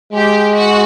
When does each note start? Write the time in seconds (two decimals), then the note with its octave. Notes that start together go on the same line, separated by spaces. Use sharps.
0.13 G#3 G4
0.55 F#4